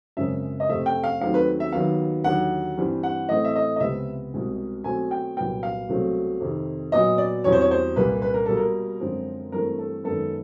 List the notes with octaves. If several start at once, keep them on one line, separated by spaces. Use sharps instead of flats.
F#2 C#3 F3 G#3 C4 E5
D#5
F2 C3 F3 A3 C4 E5
G5
F5
D#2 D#3 F#3 A3 C4 F5
B4
E5
D#2 D#3 F#3 B3 F5
D#2 D3 F#3 F#5
G2 E3 G3 C4
F#5
A2 E3 A3 C4 D#5
E5
D#5
D#5
C#2 C3 F3 G#3 B3 E5
C2 B2 G#3 C4
B2 F#3 A3 C4 G#5
G5
C2 A#2 F#3 B3 G5
F5
C2 B2 F#3 A3 C4
F2 C3 D#3
A#2 F#3 B3 D#5
D5
E2 B2 G3 C4 C#5
C5
C#5
C5
C2 A#2 G3 A#3 B4
B4
A#4
B2 G3 A#3 A4
A#4
F#2 D3 F3 G#3 C4
G2 E3 A3 C4 A#4
A4
F#2 D#3 G#3 B3 A4